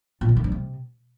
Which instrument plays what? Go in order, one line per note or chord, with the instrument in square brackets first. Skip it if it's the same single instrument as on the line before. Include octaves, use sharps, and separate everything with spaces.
[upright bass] A#2
E3
D#3
G2
C3